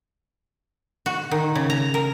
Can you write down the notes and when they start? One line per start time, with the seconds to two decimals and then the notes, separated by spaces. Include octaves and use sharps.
1.06 F#4
1.31 D#3
1.55 C#3
1.70 A#5
1.94 A#4